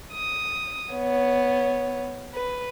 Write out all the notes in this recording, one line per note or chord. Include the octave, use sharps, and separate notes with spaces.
D#6
B3 C#5
B4